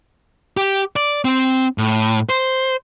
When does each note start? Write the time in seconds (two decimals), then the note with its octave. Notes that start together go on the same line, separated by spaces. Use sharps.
0.57 G4
0.96 D5
1.25 C4
1.78 A2
2.29 C5